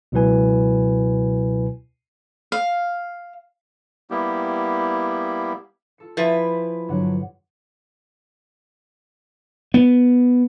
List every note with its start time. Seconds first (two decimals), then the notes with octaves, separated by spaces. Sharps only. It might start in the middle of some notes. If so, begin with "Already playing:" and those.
0.12 C#2 B2 F#3 E4 B4 G#5
2.52 F5
4.10 G3 A#3 B3 E4 G4
5.98 F4 A4 C#7
6.17 F3 E4 B4 F5 G#5 B5
6.88 G2 D3 F#3 F#5
9.74 B3